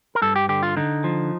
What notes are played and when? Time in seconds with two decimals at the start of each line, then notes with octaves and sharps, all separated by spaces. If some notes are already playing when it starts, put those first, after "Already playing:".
0.15 A#4
0.22 G2 A4
0.36 G4
0.49 D3 G4
0.63 F4
0.77 D3 D#4
1.04 F3